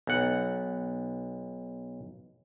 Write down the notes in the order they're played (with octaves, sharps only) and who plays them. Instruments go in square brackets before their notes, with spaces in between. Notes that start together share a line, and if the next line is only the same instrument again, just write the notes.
[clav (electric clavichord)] B1 F#5